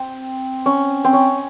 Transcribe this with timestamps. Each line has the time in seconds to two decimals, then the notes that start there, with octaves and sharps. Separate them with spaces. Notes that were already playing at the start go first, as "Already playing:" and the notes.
Already playing: C4
0.66 C#4
1.04 C4
1.13 C#4